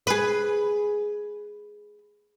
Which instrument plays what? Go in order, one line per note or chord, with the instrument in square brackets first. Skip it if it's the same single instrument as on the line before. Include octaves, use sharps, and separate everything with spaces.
[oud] G#4 B4